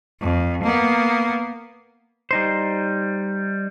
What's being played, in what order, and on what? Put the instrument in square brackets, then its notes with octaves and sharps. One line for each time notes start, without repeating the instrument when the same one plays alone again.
[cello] F2
A#3 B3
[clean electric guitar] G3 D#4 C5